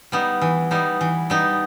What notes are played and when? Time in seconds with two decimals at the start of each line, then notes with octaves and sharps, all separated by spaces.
0.12 G3 B3 D#4
0.41 E3
0.71 G3 B3 D#4
1.01 E3
1.30 G3 B3 D#4